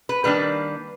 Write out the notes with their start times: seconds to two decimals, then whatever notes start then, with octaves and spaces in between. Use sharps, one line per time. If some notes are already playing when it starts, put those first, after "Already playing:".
0.09 B4
0.24 D#3 G3 A#3 D4 B4